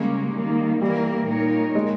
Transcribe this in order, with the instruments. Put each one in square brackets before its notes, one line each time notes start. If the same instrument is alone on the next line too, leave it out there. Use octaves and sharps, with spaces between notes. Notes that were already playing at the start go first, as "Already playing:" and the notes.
Already playing: [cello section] C#3 G3 A#3 C#4 [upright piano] G#3
[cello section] D#3 G3 A#3
[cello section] E3 A#3 E4 A#4 [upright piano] G3
[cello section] A#2 A#3 D#4 A#4 C#5
[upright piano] G#3